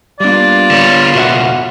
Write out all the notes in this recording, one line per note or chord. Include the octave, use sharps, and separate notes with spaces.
G3 A#3 B3 D4 F4 D5
D3 C#5
C#2 B2 F#4 E5 F#5